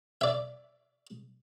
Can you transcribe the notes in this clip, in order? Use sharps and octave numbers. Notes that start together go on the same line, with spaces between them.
D5 E5